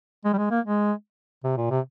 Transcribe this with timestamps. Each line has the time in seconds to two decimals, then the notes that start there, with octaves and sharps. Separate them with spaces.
0.25 G#3
0.33 G3
0.38 G#3
0.51 A#3
0.65 G#3
1.44 C3
1.57 A#2
1.70 C3